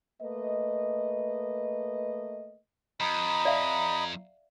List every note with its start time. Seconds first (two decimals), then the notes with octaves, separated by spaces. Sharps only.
0.22 A3 A#3 B4 D#5
3.00 F2 D#5 A#5 B5
3.45 D5 E5 F5